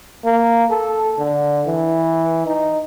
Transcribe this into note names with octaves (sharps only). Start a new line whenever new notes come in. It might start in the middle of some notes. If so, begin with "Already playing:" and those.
A#3
A4
D3
E3
D#4